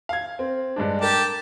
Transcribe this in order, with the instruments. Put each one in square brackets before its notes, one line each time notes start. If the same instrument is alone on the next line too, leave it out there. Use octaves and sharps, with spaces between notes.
[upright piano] F5 G#6
C4
G2 G#3 D4
[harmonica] G4 A5 [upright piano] A#4